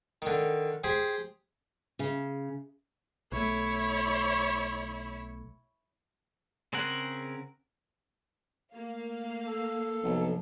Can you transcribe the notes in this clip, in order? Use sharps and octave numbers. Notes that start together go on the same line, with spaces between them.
D3 D#3
G4 G#4 C5 G#5
C#3
B1 A3 E4 C#5
C#3 C4 G#4 A#4 F#5
A3 A#3 F5
A4
B1 G2 C3 F3